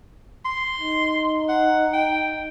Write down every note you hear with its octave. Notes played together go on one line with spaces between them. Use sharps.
C6
D#4
F#5
G5